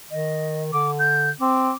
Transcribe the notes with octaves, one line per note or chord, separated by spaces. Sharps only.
D#3 D#5
D3 D6
G6
C4 D6